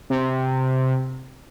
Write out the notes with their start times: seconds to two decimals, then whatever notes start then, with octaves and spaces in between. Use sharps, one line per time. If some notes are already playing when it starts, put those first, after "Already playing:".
0.10 C3